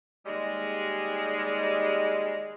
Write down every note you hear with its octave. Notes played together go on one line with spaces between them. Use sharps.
D#2 G3 G#3